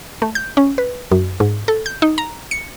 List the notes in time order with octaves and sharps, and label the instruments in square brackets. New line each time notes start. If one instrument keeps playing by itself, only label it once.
[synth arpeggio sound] A3
G6
C#4
B4
F#2
G#2
A4
G6
D#4
A#5
C#7